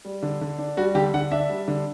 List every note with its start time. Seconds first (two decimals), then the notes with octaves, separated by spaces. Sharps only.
0.05 G3
0.23 D3
0.41 D3
0.59 D4
0.77 G3 F#4
0.95 D3 G4
1.14 D3 F#5
1.31 D4 E5
1.50 G3
1.68 D3